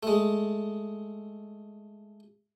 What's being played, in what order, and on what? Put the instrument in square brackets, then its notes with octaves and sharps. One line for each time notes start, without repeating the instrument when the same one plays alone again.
[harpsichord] G#3 A3